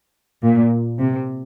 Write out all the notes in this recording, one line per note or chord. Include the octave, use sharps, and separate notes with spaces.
A#2
C3